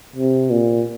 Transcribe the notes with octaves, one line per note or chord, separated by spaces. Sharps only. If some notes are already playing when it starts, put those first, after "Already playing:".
C3
A#2